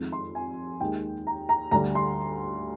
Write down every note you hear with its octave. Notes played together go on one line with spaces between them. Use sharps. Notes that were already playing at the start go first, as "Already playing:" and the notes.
Already playing: F2 D#3 G#3
C6
G#5
D#2 D#3 G#3 G5
A#5
A#5
D2 D3 G3 A#5
C6